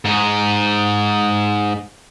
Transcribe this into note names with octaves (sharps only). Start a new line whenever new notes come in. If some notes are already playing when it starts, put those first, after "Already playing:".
G#2 D#4